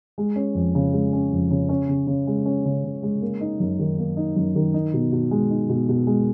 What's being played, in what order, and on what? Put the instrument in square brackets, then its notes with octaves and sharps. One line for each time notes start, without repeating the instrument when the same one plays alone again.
[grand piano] G#3
C#4
F2
C#3
G#3
C#4
F2
C#3
C#4
C#3
C#3
G#3
C#4
C#3
C#3
G#3
A#3
D#4
F#2
D#3
A#3
D#4
F#2
D#3
D#4
B2
B2
G#3
D#4
B2
B2
G#3